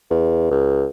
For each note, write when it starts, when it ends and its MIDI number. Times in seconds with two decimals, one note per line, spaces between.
0.11 0.51 40
0.51 0.86 37